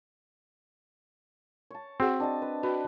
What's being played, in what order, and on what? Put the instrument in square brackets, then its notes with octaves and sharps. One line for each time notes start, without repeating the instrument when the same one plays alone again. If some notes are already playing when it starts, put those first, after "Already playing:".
[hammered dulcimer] C#5 A5
[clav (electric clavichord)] C4 [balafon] F#4 G#4 F#5
[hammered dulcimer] D4 D#5 A5
B4
[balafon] F#4 [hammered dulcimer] B4 G5